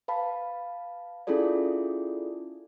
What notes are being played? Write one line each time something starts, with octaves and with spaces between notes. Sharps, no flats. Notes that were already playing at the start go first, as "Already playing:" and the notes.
B4 F5 A5 B5
C#4 E4 F4 G#4 A4 D5